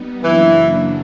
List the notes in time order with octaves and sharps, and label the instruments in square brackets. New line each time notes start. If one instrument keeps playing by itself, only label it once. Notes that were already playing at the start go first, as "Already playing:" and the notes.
Already playing: [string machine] G3 B3 D#4
[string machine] F#2 C#3 F#3 A#3 D4 [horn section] E3